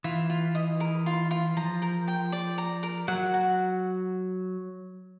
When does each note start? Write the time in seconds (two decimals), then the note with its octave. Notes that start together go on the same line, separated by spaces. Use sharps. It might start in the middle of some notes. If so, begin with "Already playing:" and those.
0.04 E3 F4
0.30 F4
0.55 D#5
0.80 A#4
1.06 F4
1.31 F4
1.57 F3 A#5
1.82 A#4
2.08 G5
2.32 D5
2.58 A#5
2.83 A#4
3.08 F#3 F#5
3.34 F#4